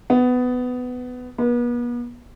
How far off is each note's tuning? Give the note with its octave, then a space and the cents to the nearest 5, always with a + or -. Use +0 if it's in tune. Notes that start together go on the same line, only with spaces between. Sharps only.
B3 +15
B3 -40